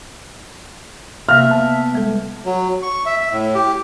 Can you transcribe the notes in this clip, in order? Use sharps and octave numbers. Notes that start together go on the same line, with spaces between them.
C3 A#3 E5 F5 F6
B3 A5
G3 G#3 A4
F#3
C#6
E5
E5
A2
G4